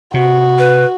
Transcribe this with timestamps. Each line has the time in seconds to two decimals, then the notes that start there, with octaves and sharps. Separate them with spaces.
0.14 C3 F#4
0.58 B4